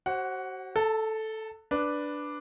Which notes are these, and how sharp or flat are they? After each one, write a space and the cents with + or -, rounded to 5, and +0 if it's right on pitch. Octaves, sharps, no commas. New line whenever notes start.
F#4 +35 C5 +30 F#5 +0
A4 -5 A5 +40
D4 +0 B4 +0